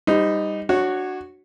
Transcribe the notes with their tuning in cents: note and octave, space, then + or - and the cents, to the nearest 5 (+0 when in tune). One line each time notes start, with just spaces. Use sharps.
G3 +15 D#4 +0 C5 -40
D4 +20 F#4 +0 C#5 -10